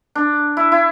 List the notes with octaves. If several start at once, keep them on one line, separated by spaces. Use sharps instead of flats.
D4
E4
E4